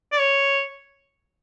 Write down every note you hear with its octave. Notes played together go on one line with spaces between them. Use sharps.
D5
C#5